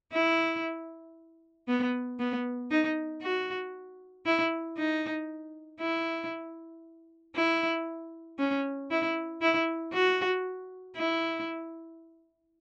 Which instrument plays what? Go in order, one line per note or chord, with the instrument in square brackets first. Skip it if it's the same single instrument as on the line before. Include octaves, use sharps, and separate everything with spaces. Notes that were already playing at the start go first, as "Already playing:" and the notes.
[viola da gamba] E4
B3
B3
D#4
F#4
E4
D#4
E4
E4
C#4
E4
E4
F#4
E4